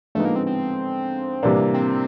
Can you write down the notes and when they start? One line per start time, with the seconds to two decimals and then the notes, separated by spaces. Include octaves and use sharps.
0.15 D3 F3 G#3 A3 B3 D#4
0.25 A#3
0.36 C4
0.47 C4
1.43 C3 E3 G3 A#3 D4
1.74 C4